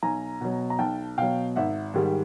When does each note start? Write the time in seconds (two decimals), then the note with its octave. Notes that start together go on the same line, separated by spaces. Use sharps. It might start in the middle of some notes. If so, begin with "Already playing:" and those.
0.03 B1 G#5 A#5
0.41 B2 F#3
0.70 A#5
0.79 B1 G5 A5
1.18 B2 F#3 F5 G5
1.56 G#1 E5 F#5
1.94 G#2 D#3 G3